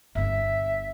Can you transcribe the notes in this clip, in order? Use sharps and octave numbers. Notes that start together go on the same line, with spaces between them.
G1 B3 E5